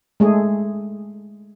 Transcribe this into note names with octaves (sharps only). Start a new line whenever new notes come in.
G#3 A3 G#4